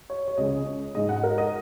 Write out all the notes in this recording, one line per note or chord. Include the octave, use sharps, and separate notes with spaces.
C#5
C#5
C#2 C#3 G#3 D#5
G#2 G#3 D#5
F#5
A#4
D#5